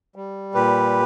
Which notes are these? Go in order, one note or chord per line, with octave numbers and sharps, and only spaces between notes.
G3
A#2 G4 B4